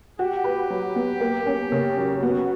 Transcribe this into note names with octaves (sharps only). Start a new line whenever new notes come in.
F#4 G4
B4
F#3
B3
A#3
C#4
C#3
F#3
B3 F#4